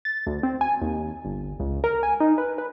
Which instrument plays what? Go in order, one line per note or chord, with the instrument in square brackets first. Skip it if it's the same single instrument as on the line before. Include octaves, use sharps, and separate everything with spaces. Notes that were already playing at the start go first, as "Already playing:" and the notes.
[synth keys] A6
D2
C4
G#5
D#2
G1
C#2
A#4
G#5
D#4
B4
B4